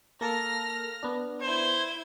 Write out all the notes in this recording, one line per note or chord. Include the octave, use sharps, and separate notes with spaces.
A#3 A4 A#4 F6 A#6
B3 D4
E4 C5 G#6